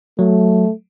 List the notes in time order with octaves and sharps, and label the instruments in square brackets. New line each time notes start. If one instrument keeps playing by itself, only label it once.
[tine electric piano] F#3 [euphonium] A3